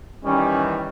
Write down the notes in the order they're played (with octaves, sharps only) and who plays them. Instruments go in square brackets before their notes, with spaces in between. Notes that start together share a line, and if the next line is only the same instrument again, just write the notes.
[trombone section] D#3 E3 G3 [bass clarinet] C#4